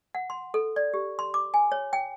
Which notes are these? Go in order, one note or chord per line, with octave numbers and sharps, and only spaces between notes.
F#5
C6
A4
D5
G4
C6
D6
G#5
C#5
G5